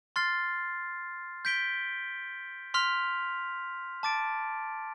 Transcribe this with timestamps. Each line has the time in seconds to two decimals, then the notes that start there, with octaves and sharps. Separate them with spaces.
0.16 C6 F6 A6 C7
1.45 G6 B6 D7 G7
2.74 C6 F6 B6 F7
4.03 A5 D6 A6 D7